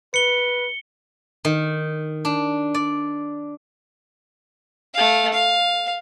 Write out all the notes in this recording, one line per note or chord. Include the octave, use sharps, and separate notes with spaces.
B4 C#7 G7
D#3
D4
D5
A3 F5
F5